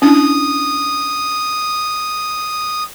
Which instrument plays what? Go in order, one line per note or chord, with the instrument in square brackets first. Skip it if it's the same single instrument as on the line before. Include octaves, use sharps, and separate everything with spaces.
[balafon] C#4 D4 E4 [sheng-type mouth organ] D#6